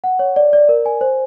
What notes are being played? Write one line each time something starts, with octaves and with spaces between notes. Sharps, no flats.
F#5
C#5
D5
D5
A#4
G#5
C5